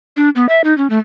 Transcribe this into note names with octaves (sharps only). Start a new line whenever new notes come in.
D4
B3
E5
D#4
C#4
A3